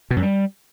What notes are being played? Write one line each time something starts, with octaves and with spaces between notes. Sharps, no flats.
B2
F#2
G3